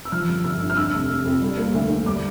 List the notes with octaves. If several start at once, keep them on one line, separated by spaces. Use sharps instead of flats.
E6
F3 F6
G1
G1 E6
G2
F6
D3 E6
F1
F1
F2
G3
A#3
D2
D3
G3 D6